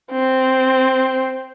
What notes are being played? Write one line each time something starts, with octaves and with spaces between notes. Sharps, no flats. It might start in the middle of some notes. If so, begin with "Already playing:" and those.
C4